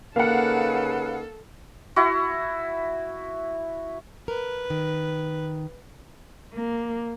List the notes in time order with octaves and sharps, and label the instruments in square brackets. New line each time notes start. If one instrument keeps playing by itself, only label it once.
[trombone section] C#3 D#4 B4 [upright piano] A#3 [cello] A4 [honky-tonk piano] F5 F#5
[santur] E4 F#4
[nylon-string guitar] A#4 [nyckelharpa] B4
[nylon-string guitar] D#3
[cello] A#3